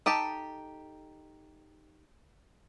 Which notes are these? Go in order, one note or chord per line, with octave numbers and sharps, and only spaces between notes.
D#4 G4 A4 A5